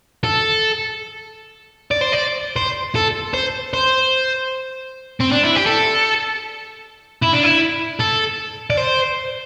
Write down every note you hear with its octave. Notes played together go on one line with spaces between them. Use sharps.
A4
D5
C5
D5
C5
A4
C5
C5
C4
D4
E4
G4
A4
E4
D4
E4
A4
D5
C5